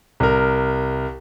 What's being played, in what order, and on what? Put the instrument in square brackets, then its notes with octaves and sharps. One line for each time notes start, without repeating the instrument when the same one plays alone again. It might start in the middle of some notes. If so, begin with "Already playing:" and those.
[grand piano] C2 A#4